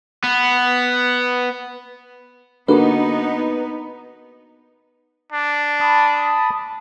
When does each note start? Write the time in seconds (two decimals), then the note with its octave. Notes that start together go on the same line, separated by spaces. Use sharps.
0.24 B3
2.68 D3 A#3 B3 D#4 F#4 B4
5.32 D4
5.81 A5 B5 D#6